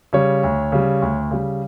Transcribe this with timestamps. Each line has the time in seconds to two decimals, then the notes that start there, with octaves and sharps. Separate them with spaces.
0.13 C#3 G3 C#5
0.43 D2
0.72 C#3 G3
1.02 D2
1.31 C#3 G3